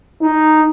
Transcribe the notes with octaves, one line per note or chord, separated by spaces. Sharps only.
D#4